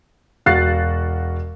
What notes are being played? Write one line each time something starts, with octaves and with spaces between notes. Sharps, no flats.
E1 F#4 F5 F#6 A6 C7